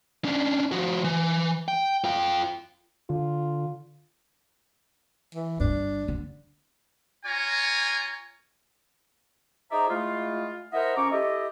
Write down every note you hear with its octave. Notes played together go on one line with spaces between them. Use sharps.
C#4 D4
F3 F#4
E3
G5
F4 G5
D3 F4
E3
G1 G2 D4
D3
F4 C#5 G#5 A#5
D#4 G#4 C5 D5 E5 A#5
G#3 A3 E4 F4
E4 A#4 C5 D#5 E5 F#5
F2 C#4 A#5 C#6 D6
E4 G4 A4 D#5